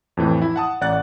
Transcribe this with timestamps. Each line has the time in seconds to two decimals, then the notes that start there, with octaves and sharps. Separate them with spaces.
0.17 F2 A2 E3
0.42 E4
0.56 F#5 A5 D#6
0.81 A1 D5 F#5 F#6 A6